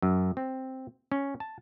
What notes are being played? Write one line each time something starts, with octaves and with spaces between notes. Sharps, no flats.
F#2
C4
C#4
A5